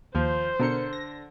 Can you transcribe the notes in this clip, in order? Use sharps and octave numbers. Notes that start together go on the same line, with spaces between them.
D#2 F3 C5
B2 D3 A#4 C#7
A#6